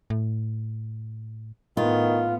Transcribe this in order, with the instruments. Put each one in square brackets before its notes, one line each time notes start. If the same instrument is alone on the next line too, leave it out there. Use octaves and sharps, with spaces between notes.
[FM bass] A2
[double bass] A2 B3 [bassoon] D#3 [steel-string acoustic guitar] F4